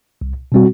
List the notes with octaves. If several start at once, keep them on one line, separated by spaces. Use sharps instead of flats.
C2
B2 G3 C4 F#4